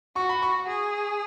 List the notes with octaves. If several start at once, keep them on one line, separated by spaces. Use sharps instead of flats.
F#4 C#6
B5
C#6
G#4